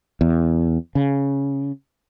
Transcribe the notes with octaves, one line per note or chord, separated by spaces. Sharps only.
E2
C#3